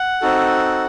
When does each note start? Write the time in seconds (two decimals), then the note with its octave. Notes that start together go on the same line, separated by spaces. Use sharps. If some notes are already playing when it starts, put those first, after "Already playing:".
Already playing: F#5
0.22 C4 D#4 F#4 A4